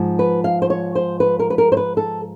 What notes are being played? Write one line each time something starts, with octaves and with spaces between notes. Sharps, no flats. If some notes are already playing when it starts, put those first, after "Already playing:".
Already playing: G#2 F3
B4
F5
C5
C#5
C5
B4
A#4
B4
A#4
C5
B4
A4